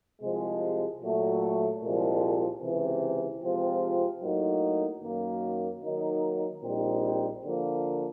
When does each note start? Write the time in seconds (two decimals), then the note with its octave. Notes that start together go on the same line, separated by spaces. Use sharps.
0.21 C2 C3 F3 G#3
1.01 A#2 F#3 A3
1.82 C2 A#2 F3 G#3
2.62 C#2 C3 E3
3.42 C3 F3 G#3 C4 F4
4.22 A2 F#3 A#3 D#4
5.03 F#2 D#3 F#3 A#3
5.82 D#3 F#3 A#3 D#4
6.63 A#1 A#2 G3 C4 D#4
7.43 D3 F3 A#3